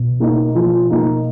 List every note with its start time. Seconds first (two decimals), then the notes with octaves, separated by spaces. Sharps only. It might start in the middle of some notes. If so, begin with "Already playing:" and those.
Already playing: B2
0.20 A#3 D#4
0.55 F3
0.90 A#3 D#4